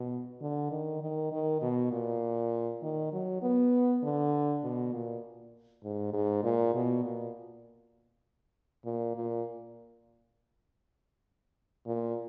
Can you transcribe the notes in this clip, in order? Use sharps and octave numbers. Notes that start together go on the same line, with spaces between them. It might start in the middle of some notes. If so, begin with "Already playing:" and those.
Already playing: B2
D3
D#3
D#3
D#3
B2
A#2
D#3
F#3
B3
D3
B2
A#2
G#2
G#2
A#2
B2
A#2
A#2
A#2
A#2